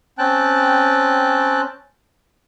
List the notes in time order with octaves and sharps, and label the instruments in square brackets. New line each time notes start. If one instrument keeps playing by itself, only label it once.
[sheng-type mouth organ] C4 C#4 G5 A5 F#6